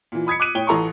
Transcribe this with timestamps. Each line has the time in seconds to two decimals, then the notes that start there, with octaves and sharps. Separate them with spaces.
0.12 A#2 E3
0.27 B5 D#6 G#6 B6 C#7
0.40 D6 F#6 D#7
0.55 A2 C#5 G5 G7
0.67 A1 E3 A4 A#5 C6 C#6